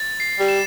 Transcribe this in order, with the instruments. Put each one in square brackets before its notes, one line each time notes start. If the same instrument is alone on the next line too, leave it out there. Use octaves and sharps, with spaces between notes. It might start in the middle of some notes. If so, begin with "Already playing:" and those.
Already playing: [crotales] A6
C7
[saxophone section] G3
[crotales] E7